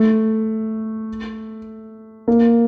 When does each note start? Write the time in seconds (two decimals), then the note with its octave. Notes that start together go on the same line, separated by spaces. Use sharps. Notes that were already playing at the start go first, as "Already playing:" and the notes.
Already playing: A3
2.28 A#3